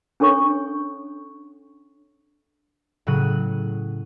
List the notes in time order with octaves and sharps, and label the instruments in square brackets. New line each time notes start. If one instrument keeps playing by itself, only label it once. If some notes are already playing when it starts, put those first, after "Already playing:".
[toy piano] C#4 D4 A4 C#5 C#6
[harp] A2 C#3 F#3 F#6 D#7